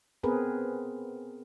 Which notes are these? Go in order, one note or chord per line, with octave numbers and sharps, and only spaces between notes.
B3 C4 G#4 A#4 B4